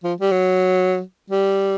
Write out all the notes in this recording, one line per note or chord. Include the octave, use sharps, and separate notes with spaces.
F3
G3
F#3
G3